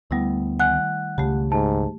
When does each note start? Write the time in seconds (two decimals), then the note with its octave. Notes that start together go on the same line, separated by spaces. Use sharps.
0.11 D2 G3 A3 B3 E4
0.60 D#3 F#5 G#5 F#6
1.18 C#2 C#3 A3 G4
1.52 G#2 A5